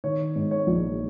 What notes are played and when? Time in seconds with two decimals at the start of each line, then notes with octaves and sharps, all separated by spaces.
0.04 D#3 C#5
0.36 G#2
0.51 C#5
0.67 A#1